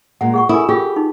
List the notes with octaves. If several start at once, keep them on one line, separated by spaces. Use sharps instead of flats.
A#2 G#3 F#5
G#4 F#5 C#6
E4 A4 A#4 G#5
F4 G4 G#4
D#4